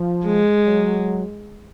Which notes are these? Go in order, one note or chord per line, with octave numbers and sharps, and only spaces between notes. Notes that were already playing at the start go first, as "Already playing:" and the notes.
Already playing: F3
G#3
F#3